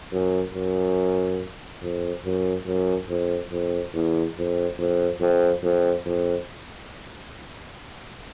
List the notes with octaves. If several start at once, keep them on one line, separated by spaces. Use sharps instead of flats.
F#2
F#2
F2
F#2
F#2
F2
F2
E2
F2
F2
F2
F2
F2